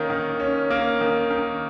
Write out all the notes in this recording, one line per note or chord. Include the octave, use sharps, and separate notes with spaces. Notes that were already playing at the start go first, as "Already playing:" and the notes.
Already playing: D#3 A#3 C#4
D#3
C#4
A#3
D#3
D#3